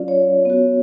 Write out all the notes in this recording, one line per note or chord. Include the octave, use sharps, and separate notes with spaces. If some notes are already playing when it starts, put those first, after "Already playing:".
Already playing: F#3 C#4 F4 D5 F5
C#5
B3 F#4